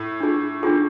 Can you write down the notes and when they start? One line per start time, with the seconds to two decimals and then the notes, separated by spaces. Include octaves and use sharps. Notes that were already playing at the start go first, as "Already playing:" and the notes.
Already playing: A2
0.20 D4 F4 G#4
0.63 D4 F4 G#4